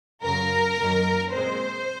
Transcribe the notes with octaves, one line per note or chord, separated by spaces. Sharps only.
F#2 C#3 F#3 A#4
F#2 D#3 F#3 A#3
A#2 G#3 C4 C5